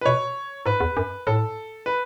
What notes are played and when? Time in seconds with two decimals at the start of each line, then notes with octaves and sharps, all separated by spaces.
0.01 B4
0.06 B2 C#5
0.66 G#2 B4
0.80 E2
0.97 F#2
1.27 A2 A4
1.86 B4